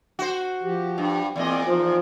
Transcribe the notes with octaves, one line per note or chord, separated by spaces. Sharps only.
F#4 C5
F3 G4
G2
E2 A#2 C4 D5 D#5
F3 D#4